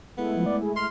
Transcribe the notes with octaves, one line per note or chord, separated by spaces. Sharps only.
G#3 A3 B3 E4
F3
D5
G#4
C6 F6